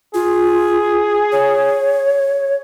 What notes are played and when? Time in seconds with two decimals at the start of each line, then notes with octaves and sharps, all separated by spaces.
0.14 F4 G#4
1.32 C#5